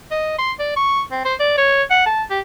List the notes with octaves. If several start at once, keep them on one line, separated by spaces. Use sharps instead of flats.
D#5
C6
D5
C#6
C4
C5
D5
C#5
F#5
A5
G4